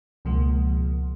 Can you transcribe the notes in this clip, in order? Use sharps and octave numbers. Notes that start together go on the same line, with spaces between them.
C#2 B2 F3 G#3 A#3